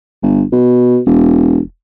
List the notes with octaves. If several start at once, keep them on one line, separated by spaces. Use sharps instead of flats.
G1
B2
E1